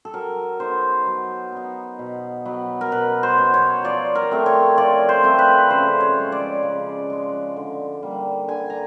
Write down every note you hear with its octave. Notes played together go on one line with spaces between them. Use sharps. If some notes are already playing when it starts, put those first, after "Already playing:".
A4
F#3 A#4
B3 D#4 C5
F#3
B3 D#4
B2
F#3 B3
A#4
B2 B4
C5
F#3 B3
C#5
F3 D5
A#4
A3 C4
C#5
F3 D5
C5
A3 C4
B4
C#3 C5
C#5
F3 G#3
D5
C#3
F3 G#3
D3
G3 A#3
D3 G#5
A#5